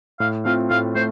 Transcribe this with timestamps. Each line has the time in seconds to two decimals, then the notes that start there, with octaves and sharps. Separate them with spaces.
0.20 A2 F5
0.45 A3 C4 F4 F5
0.70 A2 F5
0.95 A3 C5